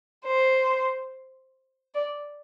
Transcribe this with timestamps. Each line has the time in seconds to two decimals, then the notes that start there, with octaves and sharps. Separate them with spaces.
0.26 C5
1.95 D5